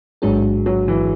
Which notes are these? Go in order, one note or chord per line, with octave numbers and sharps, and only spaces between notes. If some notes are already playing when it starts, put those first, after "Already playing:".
A1 G#2 F#3 G#3 D4 G#4
F#3
E3